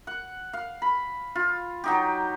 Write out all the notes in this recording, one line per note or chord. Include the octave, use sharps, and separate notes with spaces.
F#5
F5
B5
F4
F#3 D#4 G4